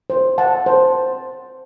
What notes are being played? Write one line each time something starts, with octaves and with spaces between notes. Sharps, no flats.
C5
F#5 A5
C5